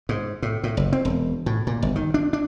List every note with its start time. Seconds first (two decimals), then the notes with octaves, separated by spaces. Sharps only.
0.09 G#2
0.42 A2
0.64 A2
0.77 F#1
0.93 C4
1.05 E1
1.46 A2
1.67 A#2
1.83 G1
1.96 D#3
2.14 D4
2.33 D4